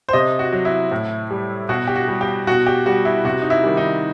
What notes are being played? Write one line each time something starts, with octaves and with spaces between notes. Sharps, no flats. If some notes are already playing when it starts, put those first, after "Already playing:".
C5
C3 D#5
F#4
F#3
E4
A2
G3
B2 F#4
G4
F#4
G3
G4
B2 F#4
G4
G3 F#4
E4
C3 F#4
D#4
E4
D#3 G3
D#4